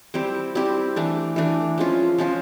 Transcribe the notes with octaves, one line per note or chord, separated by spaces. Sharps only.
G3 C4 E4 G4
G3 C4 E4 G4
E3 A3 D4
E3 A3 D4
F3 G#3 C#4 F4
F3 G#3 C#4 F4